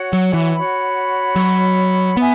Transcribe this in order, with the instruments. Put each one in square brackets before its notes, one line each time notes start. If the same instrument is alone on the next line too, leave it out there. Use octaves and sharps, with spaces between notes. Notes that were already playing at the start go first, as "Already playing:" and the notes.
Already playing: [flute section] F#4 C#5 F#5
[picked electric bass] F#3
E3
[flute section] F#4 C#5 F#5 B5
[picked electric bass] F#3
[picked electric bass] B3 [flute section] B4 E5 G#5